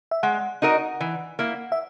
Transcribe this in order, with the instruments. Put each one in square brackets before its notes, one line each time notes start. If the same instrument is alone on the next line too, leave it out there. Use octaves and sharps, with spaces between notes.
[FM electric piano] E5
[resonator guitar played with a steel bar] G#3 [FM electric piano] F#5
[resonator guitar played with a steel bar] D#4 F#4 A#4 D#5
E3
A#3 E4
[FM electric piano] E5